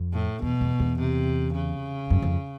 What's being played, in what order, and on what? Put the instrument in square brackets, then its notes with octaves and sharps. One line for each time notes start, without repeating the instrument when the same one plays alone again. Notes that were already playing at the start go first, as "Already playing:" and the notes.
Already playing: [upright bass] F2
[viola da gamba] A2
[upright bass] E2 [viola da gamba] B2
[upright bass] E2
E2
[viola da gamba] C3
C#3
[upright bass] F#2
F2